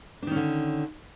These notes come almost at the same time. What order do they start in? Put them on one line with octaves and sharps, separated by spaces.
D4 D#3 C#4 D3